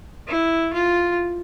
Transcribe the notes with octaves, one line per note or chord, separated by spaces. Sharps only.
E4
F4